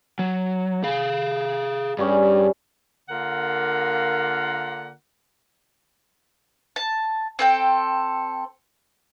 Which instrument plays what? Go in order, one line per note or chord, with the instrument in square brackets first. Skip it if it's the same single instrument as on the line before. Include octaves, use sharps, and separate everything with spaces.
[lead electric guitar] F#3
G#4 F5
[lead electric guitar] G2 [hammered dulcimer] G3 C#4 G#4
[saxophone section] D3 A#3 F4 A#4 F#5
[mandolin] A5
C4 A4 G5